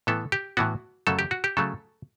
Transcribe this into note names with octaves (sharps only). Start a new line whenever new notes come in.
A2 E3 B3 A4
G4
A2 E3 B3 F#4
F#2 C#3 F#3 A3 A4
G4
F#4
G4
C#3 F#3 A3 A4